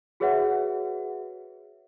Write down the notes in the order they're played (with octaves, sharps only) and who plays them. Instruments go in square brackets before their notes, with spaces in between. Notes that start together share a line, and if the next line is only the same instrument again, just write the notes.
[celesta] F#4 G#4 B4 C#5 E5 F#5